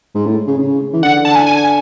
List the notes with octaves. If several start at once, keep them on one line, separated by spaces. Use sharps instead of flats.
G#2
A2
C#3
C#3
E3
D3 F#5
A5
G#5
G#5